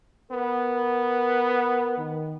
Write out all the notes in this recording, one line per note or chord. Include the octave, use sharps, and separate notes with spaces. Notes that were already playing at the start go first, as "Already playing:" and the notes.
B3 A#4
D#3